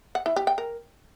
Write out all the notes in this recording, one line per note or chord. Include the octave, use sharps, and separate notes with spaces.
F#5
E4
G4
G5
A#4